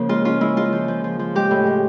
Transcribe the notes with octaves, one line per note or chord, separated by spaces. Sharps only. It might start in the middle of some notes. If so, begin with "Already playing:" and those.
Already playing: C#3 F3 A#3
G#3 F4
C#4 F4
G#3 E4
G#3 F4
F3
F3
F3
F3
G#3 G4
A2
G#3